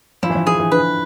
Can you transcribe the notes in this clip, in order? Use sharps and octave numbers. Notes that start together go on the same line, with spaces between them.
F3 E4
E3
F3
E3 G#4
E3
D3 B4